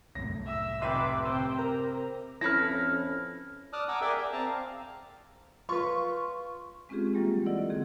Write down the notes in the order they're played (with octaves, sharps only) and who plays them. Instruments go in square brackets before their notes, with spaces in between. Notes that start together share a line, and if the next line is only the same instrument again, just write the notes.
[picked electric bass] C2 F#2 A2 [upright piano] A#6
[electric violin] E5 E6
[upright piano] F1 E5 D#7 [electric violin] B4 D6 [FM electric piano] G5 C6
[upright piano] C3 C4 [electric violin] C5 G5 [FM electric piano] D6 E6
[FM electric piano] A#4 [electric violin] A#5
[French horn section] F2 C4 C#4 [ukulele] E4 A4 B4 [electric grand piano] F6 A#6
[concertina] D5 A5 D#6 F6 F#6
F#5 G#5 A#5 D6 E6
G#4 A#4 D5 E5 G5 G#5
D5
C4 A5 A#5
F5
[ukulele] F4 B4 [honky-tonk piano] C6 C#6
[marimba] G#3 C4 C#4 F4 G4 G#4
E3 F#3 G3 A#3 F4
E4 A4 D5 D#5 F#5
D3 D#3 C4 G#4